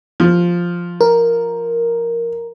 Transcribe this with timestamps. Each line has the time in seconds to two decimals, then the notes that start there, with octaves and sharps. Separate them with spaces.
0.20 F3
1.01 A#4